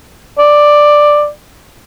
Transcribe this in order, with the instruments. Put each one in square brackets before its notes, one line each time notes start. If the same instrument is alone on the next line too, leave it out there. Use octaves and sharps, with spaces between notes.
[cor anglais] D5